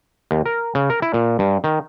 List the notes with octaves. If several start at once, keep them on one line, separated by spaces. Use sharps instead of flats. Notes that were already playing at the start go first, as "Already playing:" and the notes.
D#2
A#4
C#3
A#4
E4
A#2
G2
D#3